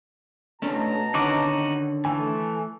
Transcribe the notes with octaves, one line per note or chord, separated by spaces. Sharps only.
B2 A3 C#4 D4 A5 A#5
D3 D#3 C#4 D#4 F#4 D6
E3 A3 G#5